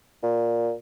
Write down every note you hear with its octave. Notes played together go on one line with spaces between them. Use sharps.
A#2